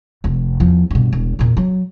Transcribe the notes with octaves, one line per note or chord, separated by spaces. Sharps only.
F1 F2
E2 F3
G2 B2
E1
E2 A#2
F#3